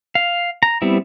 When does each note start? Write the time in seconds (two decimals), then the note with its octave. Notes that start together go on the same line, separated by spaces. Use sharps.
0.15 F5
0.63 A#5
0.82 G3 B3 C4 E4